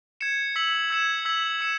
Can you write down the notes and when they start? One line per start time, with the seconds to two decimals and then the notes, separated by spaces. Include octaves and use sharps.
0.21 G#6 C#7 E7
0.56 E6 B6 F#7
0.90 E6 G#6 C#7 E7
1.25 E6 G#6 B6 F#7
1.61 E6 C#7 E7